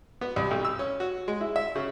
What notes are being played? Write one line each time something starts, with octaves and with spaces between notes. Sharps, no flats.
B3
C2
B1
E6
C#4
F#4
G#3
E4
E5
C#3